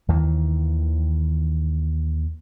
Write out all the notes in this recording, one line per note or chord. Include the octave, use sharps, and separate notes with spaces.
D#2 D#3 E3